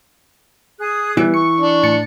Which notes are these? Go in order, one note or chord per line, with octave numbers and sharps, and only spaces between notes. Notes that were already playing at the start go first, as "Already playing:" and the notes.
G#4 D#6 F#6
E3 G3 B3
C#6 C#7
D4
A2 A6 C#7